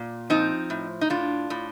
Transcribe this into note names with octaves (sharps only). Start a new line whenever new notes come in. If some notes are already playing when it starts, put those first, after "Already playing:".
Already playing: A#2
F3 C4 D#4
A2
D#4
A2 D4 F4
A2